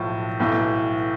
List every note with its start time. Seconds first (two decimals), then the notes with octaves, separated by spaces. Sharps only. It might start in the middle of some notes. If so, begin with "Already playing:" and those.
Already playing: B1 A2 F3
0.40 B1 A2 E3